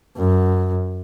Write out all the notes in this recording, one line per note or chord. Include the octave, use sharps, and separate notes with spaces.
F#2